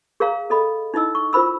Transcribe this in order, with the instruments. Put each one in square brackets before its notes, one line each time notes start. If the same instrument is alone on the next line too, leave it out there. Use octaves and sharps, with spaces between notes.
[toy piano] G#4 A#4 C#5 F5 A#5
A4 D#5 B5
D#4 E4 D#5 E6
C#6
F4 A#4 C5 B5 E6